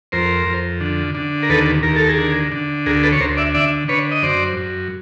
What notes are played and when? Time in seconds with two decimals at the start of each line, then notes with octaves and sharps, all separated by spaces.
0.12 F2 A#4 C5
0.46 F2
0.80 D3
1.15 D3
1.43 A#4
1.49 D#2 A4 B4
1.83 D#2 A#4
1.96 A4
2.09 G#4 A#4
2.18 D3
2.52 D3
2.86 D2 G#4 A#4
3.03 A4 B4
3.12 C#5
3.20 D2 A#4 C5
3.37 D5 E5
3.54 D3 D5 E5
3.88 D3 B4 C#5
4.11 D#5
4.23 F#2 C5 D5
4.57 F#2